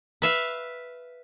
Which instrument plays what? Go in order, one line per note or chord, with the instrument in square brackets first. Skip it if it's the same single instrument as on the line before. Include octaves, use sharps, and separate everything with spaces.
[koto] B4 E5 F5